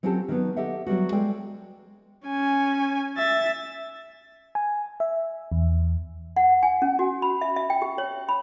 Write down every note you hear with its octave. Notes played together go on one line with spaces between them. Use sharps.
F#3 C4 C#4 F4 G4 A4
D#3 F#3 B3
G4 A4 D#5 E5 F#5
F#3 G3 B3 F#4
G#3 A4 D5 G5
C#4 G#5
E5 A6
G#5
E5
E2
F#5
G#5
C#4
F#4
B5
E5
E5
G5
G4
C#5
B5